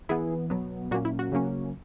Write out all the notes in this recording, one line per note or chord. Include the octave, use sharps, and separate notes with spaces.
E3 B3 E4 G#4
B2 F#3 B3
A#2 F#3 A#3 C#4 F#4
E4
F#4
C#3 F#3 A#3 C#4